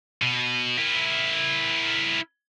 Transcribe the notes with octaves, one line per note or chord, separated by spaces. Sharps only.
B2
E4 A#4